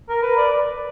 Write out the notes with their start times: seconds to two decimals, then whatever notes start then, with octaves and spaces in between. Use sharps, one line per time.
0.09 A#4
0.23 B4
0.37 D5